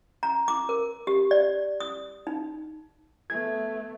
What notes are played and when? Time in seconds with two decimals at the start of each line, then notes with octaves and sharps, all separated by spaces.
0.23 A#5
0.48 D6
0.69 A#4
1.07 G4
1.31 D5
1.80 D#6
2.27 D#4
3.30 A3 B3 G#6